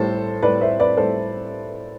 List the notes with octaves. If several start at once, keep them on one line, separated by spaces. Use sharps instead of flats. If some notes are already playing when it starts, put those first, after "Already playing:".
Already playing: A2 G3 A4 C5
A2 G3 B4 D5
C5 E5
B4 D5
A2 G3 A4 C5